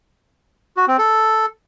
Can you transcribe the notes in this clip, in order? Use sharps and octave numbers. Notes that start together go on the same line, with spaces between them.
F#4
C4
A4